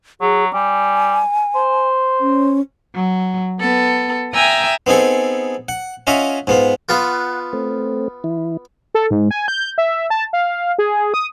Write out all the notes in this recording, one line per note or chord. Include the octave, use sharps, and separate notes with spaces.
F#3 G#4
G3 G#5
C5
C#4
F#3
B3 A4
E5 G5 G#5 A#5 D#6 E6
B3 C4 D#4 G#4 A4
F#5
C#4 F4 D#5 E5 F#5
G#2 B3 F4
B3 F4 F#5
A3 C4
E3 E4
A4
G#2
G#5
G6
E5
A5
F5
G#4
D#6